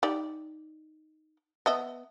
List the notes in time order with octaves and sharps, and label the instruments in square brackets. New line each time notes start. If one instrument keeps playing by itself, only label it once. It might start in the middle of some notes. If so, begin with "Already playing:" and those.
[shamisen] D#4 G4 D5
B3 D#5 E5